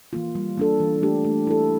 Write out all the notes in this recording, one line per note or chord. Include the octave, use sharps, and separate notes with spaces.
E3 A#3 F4
G3
A#3 D4 A4
E3
A3 D4 G4
A3
E4 A4